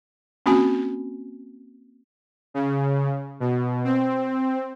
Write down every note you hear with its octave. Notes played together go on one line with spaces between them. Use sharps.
A#3 C4 C#4 F#4 G#5
C#3
B2
C4